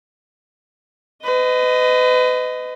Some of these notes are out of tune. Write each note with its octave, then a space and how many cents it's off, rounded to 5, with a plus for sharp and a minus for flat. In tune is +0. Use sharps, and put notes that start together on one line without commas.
B4 +35 D#5 +0